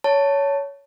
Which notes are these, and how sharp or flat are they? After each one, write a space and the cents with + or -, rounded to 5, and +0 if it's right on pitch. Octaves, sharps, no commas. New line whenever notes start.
C#5 +15 A5 +10